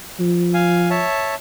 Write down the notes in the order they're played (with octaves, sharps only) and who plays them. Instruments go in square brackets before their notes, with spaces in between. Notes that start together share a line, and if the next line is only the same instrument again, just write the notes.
[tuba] F3
[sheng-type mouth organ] F5 G#5
C#5 E5 A5